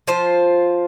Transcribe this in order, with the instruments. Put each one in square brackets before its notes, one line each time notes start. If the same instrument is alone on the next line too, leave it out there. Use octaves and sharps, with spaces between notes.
[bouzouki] F3 F4 C5